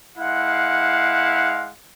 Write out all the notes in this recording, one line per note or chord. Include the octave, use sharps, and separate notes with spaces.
G#3 E4 F5 F#5